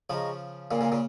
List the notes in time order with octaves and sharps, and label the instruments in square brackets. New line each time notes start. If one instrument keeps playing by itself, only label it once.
[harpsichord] C#3 F3 [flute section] G#4 D#5 A#5 C#6
[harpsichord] A#2 C#3 [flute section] A#4 F5 G#5
[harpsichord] A#2 C#3
A#2 C#3